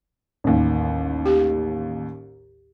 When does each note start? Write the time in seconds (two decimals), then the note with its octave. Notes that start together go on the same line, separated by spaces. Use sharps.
0.44 A1 D#2
1.26 G4